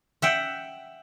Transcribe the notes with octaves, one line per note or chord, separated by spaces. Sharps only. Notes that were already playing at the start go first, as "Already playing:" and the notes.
E5 F#5 G5